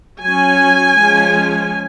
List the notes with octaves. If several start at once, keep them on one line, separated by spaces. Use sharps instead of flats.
F#3 C#4 G#5
F3 G#3 C#4